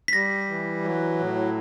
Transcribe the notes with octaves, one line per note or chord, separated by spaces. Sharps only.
B6
G3 A#6
E3
F#3
A2